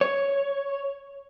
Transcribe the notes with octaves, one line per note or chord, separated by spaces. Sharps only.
C#5